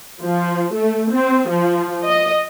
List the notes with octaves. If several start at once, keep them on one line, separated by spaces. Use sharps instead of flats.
F3
A3
C4
F3
D#5